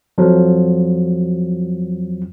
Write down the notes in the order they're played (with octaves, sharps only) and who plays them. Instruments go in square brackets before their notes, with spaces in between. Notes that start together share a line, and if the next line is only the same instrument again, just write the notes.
[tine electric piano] F2 F3 F#3